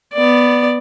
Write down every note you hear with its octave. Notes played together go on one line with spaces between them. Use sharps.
B3 D5